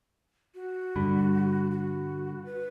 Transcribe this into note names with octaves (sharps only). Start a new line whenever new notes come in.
F#4
G2 D3 G3 B5
F#4
B4